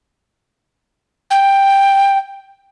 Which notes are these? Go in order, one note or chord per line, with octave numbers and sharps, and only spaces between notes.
G5